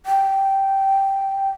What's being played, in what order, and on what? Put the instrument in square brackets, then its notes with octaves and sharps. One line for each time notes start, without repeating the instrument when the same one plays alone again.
[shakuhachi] G5